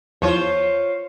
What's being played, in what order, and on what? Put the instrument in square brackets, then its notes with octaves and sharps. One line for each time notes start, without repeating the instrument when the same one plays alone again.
[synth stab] E2 F3 [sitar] F4 C5 C#5